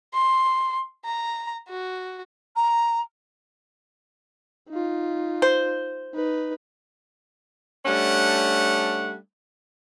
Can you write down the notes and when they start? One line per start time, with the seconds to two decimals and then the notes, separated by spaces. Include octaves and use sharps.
0.14 C6
1.05 A#5
1.69 F#4
2.56 A#5
4.69 D#4 F4
5.42 C5
6.15 D#4 B4
7.86 G3 A3 C#4 D4 F#5